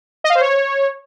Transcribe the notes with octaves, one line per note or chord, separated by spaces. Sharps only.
D#5
F5
C5
C#5